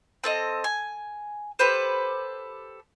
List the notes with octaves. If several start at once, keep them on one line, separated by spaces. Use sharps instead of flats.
C4 A4 D#5
G#5
G4 A4 B4 C5